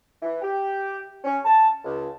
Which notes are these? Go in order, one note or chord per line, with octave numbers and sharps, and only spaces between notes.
E3
G4
C#4
A5
C#2